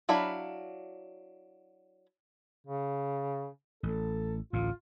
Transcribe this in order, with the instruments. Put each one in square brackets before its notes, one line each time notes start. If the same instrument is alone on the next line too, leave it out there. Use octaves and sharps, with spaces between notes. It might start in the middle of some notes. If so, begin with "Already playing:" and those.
[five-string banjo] F#3 D4 E4 F5 B5
[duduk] C#3
[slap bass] A1 [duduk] A4
[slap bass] A1 D2 A2 [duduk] F4